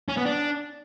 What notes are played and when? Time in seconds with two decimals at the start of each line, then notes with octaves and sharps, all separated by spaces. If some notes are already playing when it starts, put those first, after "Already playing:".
0.09 C#4
0.17 B3
0.25 D4